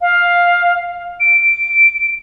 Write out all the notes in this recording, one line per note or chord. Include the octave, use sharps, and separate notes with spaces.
F5
D7
D7